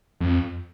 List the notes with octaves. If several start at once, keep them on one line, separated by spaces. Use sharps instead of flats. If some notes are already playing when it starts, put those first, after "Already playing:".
F2